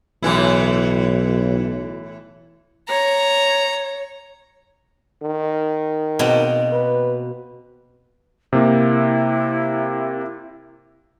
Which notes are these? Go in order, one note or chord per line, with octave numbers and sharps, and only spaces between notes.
B1 A2 E3 E4
C#5 A#5
D#3
B2 A#3 C4
B4
C3 A#3 E4